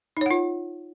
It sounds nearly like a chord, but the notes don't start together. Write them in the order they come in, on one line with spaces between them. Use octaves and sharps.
D#4 C#5 F#5 F4